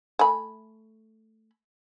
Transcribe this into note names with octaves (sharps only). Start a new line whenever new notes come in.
A3 G#5 B5